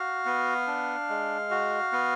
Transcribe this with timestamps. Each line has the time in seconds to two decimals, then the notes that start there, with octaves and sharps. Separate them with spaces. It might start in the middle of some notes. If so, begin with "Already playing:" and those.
Already playing: F#4 F5
0.26 B3
0.67 D4
1.09 G#3
1.50 F#4
1.93 B3